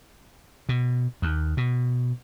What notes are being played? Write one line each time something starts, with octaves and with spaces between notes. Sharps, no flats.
B2
D#2
B2